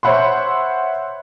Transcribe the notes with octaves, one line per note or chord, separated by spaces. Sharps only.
C5 C#5 E5 F#5 B5 C6